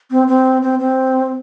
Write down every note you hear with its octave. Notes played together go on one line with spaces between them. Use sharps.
C4
C4
C4
C4